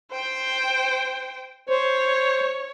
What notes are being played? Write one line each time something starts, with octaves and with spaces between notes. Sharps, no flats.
C5 G5
C5 C#5